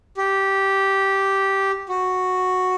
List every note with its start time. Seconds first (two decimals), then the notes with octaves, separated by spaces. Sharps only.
0.17 G4
1.89 F#4